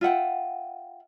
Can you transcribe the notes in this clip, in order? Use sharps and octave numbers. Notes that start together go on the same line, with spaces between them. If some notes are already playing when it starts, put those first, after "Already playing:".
F4 E5 F#5 G5